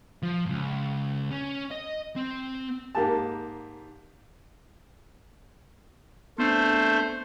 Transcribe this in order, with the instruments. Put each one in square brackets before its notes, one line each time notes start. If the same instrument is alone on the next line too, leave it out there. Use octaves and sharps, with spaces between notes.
[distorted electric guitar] F3
C#2 G2
C#4
D#5
C4
[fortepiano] G#2 A#3 G4 A5
[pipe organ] A3 C5 [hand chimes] B3 C4 D4